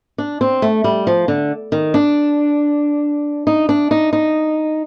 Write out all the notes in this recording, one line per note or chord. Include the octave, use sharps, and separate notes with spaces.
D4
C4
A3
G3
F3
D3
D#3
D4
D#4
D4
D#4
D#4